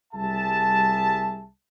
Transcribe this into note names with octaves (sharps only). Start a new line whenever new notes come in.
C2 G3 G#4 E5 A5